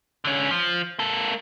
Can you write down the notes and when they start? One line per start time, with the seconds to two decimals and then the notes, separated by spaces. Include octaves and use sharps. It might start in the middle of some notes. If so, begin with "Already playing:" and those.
0.25 D3 C#4
0.51 F3
0.99 A#3 A4